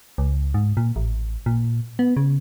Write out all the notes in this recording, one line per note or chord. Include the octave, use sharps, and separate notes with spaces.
C#2
G#2
A#2
A1
A#2
B3
C#3